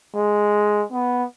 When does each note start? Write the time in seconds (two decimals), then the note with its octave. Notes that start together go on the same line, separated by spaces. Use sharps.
0.15 G#3
0.92 B3